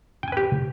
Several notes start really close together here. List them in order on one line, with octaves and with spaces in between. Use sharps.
G5 G#5 B4 G4